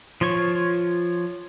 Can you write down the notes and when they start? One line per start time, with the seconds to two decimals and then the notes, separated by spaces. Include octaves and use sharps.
0.21 F3 F4 C#5 C#6